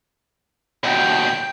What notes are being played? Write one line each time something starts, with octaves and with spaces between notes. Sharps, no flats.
D#2 B2 G5